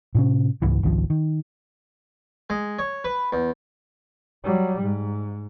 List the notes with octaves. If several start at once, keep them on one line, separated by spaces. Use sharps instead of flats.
A2 C3 C#4
C#2 G#2 E3
G#1 C#2 D#3 F3
D#3
G#3
C#5
B4
E2
F#3 G3
G#2